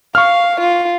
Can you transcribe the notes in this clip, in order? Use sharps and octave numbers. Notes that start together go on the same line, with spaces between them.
F5 C#6 F6
F4